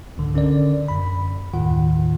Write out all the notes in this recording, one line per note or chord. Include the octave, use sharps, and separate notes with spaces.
C#2 G#2 D3
D3 C#4 A#4 D5
F#2 B5
D#2 A2 D#3 F4 F#5